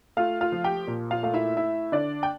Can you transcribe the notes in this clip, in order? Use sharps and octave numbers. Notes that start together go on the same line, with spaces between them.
A3 F4 F5
F4 F5
F3
G4 G5
A#2
F4 F5
A3 F5
E4 E5
E4 E5
D3 D4 D5
G5